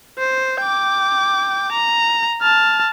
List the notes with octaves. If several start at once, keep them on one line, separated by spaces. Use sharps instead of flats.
C5
G5 D6
A#5
A5 F6